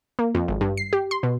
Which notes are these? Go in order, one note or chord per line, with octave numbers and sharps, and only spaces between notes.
A#3
F2
G#1
G2
C7
G4
C6
B2